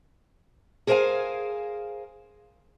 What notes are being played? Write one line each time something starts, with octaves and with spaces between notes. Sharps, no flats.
G#4 A#4 C5 D5 F5 G#5